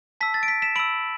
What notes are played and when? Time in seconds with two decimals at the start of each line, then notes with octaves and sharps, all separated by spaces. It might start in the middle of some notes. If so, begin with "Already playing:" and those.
0.21 A5 E6 B6
0.34 A6
0.43 D7
0.48 B6
0.62 B6 E7
0.76 B5 E6 D7 F#7